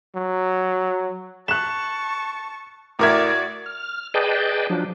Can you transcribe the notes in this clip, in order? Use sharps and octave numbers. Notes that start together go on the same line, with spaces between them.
F#3
A5 C#6 F#6 E7
A2 F#4 A#4 D5 E5 D6 G#6
F6
G#4 B4 D5 D#5 G5 A5
F3 F#3 D4